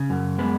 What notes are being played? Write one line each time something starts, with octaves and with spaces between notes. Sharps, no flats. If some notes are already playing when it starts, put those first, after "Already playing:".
Already playing: C#3
F#2
G#3 B3